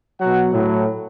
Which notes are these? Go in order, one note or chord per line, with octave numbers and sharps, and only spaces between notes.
B2 F#3 F#5
A2 F#3